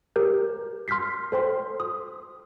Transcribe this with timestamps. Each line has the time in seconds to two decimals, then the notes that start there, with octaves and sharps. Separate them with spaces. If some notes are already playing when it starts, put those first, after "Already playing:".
0.16 G4 A#4 G6
0.88 C6 F6 G6 B6 C7
1.32 A4 C5 G5 C6
1.80 D#6